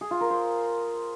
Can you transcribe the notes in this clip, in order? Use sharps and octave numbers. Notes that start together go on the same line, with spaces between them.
G#4
F4
A#4
C5